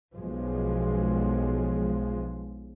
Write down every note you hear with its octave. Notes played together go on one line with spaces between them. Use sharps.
B1 F3 G#3